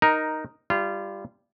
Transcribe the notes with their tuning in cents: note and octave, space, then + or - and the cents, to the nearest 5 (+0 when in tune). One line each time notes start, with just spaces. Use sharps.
D#4 +0 A#4 +5
G3 +5 F4 -25